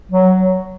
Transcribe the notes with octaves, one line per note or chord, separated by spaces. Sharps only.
F#3